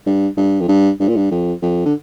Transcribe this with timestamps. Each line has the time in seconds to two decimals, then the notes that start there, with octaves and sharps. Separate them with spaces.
0.06 G2
0.37 G2
0.61 F2
0.68 G2
1.00 G2
1.08 A#2
1.16 G2
1.31 F2
1.62 F2
1.86 D3